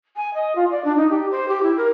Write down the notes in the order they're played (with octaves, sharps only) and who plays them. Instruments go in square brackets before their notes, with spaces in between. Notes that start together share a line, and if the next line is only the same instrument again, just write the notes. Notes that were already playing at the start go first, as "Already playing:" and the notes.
[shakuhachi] G#5
D#5
F4
D5
D4
D#4
G4
C5
G4
E4
A#4